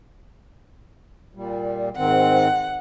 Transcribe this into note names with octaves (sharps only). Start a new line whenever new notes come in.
A#2 G3
G#2 D#3 C4 F#5